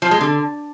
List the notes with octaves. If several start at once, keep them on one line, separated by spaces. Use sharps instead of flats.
F3
G#3
D3